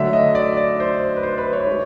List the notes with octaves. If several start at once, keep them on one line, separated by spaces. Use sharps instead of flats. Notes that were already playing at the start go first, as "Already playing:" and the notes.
Already playing: D3 F#3 A3 E5
D#5
D5
D5
C5
B4
C5
B4
C#5
G#3